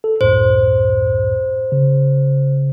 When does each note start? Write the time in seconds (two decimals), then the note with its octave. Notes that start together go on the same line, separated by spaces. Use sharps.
0.04 A4
0.21 C#2 F#2 A2 C5
1.72 C#3